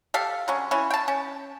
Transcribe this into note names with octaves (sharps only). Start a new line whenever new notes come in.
G4 A4 F5
D3 F#3 C#4
E3 C#4
G5 A5
C#4